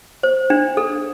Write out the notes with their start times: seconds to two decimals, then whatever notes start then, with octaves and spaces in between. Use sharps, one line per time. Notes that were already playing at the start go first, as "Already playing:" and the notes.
0.23 C5
0.50 D4
0.77 A4